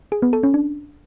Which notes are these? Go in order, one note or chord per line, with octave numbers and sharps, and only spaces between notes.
G#4
B3
A4
C#4
D4